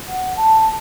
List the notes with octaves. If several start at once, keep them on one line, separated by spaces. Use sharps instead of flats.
F#5
A5